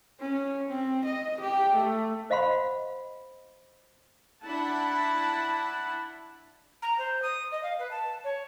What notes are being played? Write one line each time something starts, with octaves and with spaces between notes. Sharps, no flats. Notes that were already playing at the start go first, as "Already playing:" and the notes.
C#4
C4
D#5
G4
A3
C5 D#5 F5 F#5 B5 C6
D4 E4 F#5 A5 B5
A#5
C5
D#6
D#5
F5
B4
A5
C#5